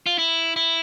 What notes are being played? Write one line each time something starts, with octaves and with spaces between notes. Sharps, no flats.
F4
E4
E4